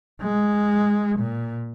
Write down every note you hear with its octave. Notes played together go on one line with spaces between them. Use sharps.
G#3
A#2